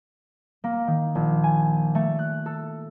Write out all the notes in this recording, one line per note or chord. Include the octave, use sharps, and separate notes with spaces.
A#3
D#3
A#1
G#5
A3
F#6
A4